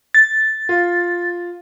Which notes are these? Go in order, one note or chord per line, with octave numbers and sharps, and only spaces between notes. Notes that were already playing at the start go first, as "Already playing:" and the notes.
A6
F4